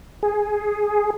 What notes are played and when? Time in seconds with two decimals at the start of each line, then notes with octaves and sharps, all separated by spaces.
0.23 G#4